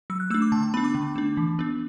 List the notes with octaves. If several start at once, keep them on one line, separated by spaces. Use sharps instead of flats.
F#3 E6
F#6
A3 D4 E6
D6
D3 A5
A5
B3 D4 B5
D6
D3
A3 D4
E3
B3 D4